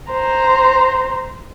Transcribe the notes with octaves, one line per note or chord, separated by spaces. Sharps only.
C5 A#5